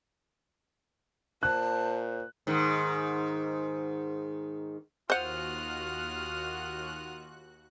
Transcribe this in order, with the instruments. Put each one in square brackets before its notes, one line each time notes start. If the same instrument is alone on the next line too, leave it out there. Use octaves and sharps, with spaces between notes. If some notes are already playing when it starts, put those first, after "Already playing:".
[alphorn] A#2 [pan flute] C5 [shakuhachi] A5 [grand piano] F#6
[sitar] G#2 D#3
[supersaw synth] D#2 F#4 F#6 [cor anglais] F4 [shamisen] C5 F#5 [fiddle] D#6 F6